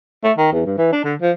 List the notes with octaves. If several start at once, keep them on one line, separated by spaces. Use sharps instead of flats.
A3
D#3
E2
G2
E3
D4
D3
F3